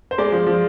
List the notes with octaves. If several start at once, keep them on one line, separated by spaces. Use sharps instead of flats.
C5
G#3 D5
F3
F3